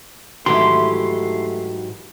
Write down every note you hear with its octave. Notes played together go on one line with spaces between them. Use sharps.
G#2 D#3 E3 F#3 A3 E4 G4 C6